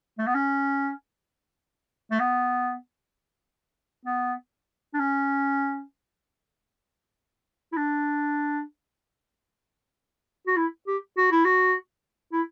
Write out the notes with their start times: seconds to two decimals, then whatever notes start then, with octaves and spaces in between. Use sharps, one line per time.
0.19 A3
0.27 B3
0.35 C#4
2.11 A3
2.20 B3
4.05 B3
4.94 D4
4.99 C#4
7.73 E4
7.77 D4
10.47 F#4
10.57 E4
10.87 G4
11.17 F#4
11.31 E4
11.45 F#4
12.32 E4